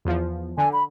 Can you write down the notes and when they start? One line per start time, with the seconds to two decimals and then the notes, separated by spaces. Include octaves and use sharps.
0.05 E2 F3
0.58 D3 G#5
0.73 B5